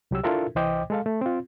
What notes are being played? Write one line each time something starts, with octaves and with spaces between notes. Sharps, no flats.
C2 F#3 G4 E6
D4 E4 F4 A4 A#4 E5
C2 E3 C5 D#5 G5 D6
G#3 A4 F5
A3
C4 F4